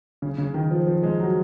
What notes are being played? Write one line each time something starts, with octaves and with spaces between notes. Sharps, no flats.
C#3
C#3
D#3
F3
F3
G#3
F#3